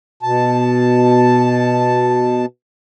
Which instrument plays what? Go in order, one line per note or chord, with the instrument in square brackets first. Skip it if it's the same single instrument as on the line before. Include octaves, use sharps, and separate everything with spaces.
[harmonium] B2 A5